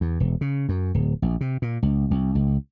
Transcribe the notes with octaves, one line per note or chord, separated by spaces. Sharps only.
E2
E1
C#3
F#2
D1
A#1
C3
A#2
C#2
C2
C#2